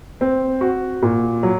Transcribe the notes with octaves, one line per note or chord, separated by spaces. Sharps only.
C4
F#4
A#2
F#3